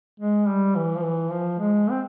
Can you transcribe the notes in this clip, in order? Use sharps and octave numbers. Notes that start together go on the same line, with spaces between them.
G#3
G3
E3
F3
E3
F3
G#3
C4